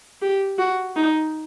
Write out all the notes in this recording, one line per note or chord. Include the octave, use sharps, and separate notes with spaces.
G4
F#4
D#4